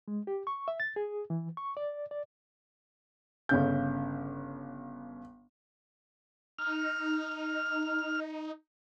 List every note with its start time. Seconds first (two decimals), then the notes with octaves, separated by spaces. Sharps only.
0.08 G#3
0.27 G4
0.47 C#6
0.68 E5
0.80 A6
0.96 G#4
1.30 E3
1.57 C#6
1.77 D5
2.11 D5
3.49 G1 C#3 G6
6.58 D#4 F6